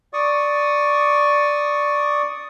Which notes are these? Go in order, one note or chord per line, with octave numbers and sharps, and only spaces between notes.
D5 C#6 D#6